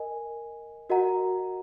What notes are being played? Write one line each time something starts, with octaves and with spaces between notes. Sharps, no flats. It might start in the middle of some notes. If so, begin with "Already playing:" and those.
Already playing: A#4 D#5 G#5
F#4 A#4 D#5 F#5 A#5